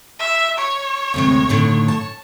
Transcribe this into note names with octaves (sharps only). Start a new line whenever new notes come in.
E5
C#5
D2 C3 G#3
A2 D3 D#3
A5